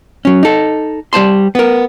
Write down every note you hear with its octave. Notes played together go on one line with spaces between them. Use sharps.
F#3 C#4
D#4 A4
G3 C5 A5 C6
B3 A#4